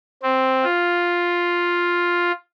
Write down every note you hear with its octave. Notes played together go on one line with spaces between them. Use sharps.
C4
F4